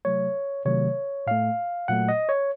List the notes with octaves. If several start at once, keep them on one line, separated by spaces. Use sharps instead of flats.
C3 F#3 A3 C#5
C3 D#3 F#3 A3 C#5
A2 A3 F5
A#2 F#3 A3 F#5
D#5
C#5